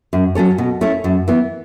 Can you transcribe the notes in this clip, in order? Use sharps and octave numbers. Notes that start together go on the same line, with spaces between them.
F#2
F#3 C#4 A4 C#5
B2
A3 C#4 E4 C#5
F#2
E3 B3